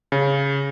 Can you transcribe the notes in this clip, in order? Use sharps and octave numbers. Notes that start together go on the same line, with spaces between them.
C#3